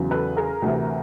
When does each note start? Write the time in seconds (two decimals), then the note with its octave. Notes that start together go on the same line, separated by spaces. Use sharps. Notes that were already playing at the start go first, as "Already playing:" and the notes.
Already playing: E2 C#3 F#3
0.10 A4 B4
0.37 G#4 A#4
0.62 D2 C3 E3